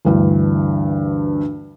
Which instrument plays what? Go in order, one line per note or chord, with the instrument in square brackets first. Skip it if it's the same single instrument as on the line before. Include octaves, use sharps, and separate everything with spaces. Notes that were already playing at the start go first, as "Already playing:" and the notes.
[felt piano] D2 G2 E3